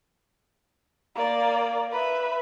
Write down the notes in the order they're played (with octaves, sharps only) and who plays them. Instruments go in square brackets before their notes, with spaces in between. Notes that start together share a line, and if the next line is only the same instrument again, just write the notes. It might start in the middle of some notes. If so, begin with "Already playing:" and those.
[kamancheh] A#3 D5
B4 E5